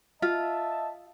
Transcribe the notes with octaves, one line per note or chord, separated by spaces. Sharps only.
F4 D#5 E5 A5